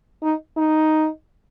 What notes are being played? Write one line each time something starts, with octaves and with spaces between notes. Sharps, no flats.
D#4
D#4